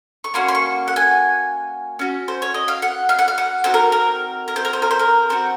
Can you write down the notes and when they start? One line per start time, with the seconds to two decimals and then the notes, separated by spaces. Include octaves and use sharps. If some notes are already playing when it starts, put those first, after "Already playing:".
0.24 C#6
0.34 A#3 C#4 F#4 C6
0.48 C6
0.55 C#6
0.88 F#5
0.96 G#5
1.99 C#4 F#4
2.28 C5
2.42 C#5
2.54 D#5
2.68 F5
2.82 F#5
3.09 F5
3.19 F#5
3.28 F5
3.38 F#5
3.64 C4 D#4 F#4 C5
3.74 A#4
3.92 A#4
4.48 A#4
4.56 C5
4.65 A#4
4.73 C5
4.82 A#4
4.91 C5
4.99 A#4
5.30 C4 D#4 F#4 C5